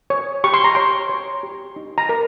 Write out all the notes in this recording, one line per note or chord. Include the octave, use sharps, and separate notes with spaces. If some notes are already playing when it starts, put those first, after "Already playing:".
C#5
G4 C#6
C6
A#5
C#5 C6
C#5
G4
D#4
A#5
A#4